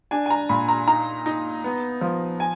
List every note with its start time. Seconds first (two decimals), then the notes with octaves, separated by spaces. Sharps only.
0.11 D4 G#5
0.26 G#5
0.30 A#5
0.49 A#2 B5
0.68 A#5
0.87 D#4 A#5
1.26 D#4
1.64 B3
2.01 F3
2.40 G#5